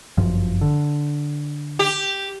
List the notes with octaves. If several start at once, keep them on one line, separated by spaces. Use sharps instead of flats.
G1 F#2 F3
D3
G4